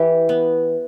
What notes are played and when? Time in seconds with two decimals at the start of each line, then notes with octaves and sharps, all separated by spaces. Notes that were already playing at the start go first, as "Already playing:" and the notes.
Already playing: E3 G4
0.29 B3